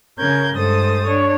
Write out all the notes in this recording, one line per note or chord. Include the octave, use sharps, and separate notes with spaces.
C#3 A#4 G6 G#6
G2 G#3 A4 C5 D#6 A6
D4 C#5